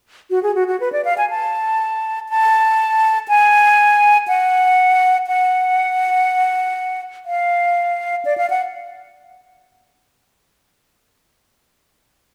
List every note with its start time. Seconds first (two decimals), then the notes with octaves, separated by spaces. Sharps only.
0.30 F#4
0.43 G#4
0.55 F#4
0.68 F#4
0.80 B4
0.93 D5
1.05 F5
1.18 G#5
1.30 A5
2.29 A5
3.28 G#5
4.28 F#5
5.27 F#5
7.26 F5
8.25 D5
8.38 F5
8.50 F#5